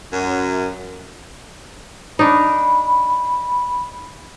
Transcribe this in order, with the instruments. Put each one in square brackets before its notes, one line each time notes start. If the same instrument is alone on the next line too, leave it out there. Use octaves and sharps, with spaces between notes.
[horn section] F#2
[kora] D4 D#4 [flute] B5